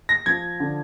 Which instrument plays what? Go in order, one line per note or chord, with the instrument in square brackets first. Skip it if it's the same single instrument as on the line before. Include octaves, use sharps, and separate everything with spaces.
[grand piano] A#6
[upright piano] F3 [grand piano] G#6
[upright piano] D3